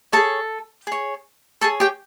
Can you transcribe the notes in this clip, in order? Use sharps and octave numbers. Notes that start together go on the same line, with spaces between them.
G#4 A4 C#5 A5
G#4 C#5
G#4 A4 C#5 A5
G4 G5